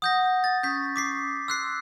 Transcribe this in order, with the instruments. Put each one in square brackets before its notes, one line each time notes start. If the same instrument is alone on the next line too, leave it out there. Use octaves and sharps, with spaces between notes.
[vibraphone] F#5 [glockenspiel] D#6 G6 A#6
[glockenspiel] A6
[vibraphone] C#4 C#6 D#6 [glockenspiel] G6 B6
[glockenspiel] D6 B6 C7
[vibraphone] C6 [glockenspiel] E6 F#6 C7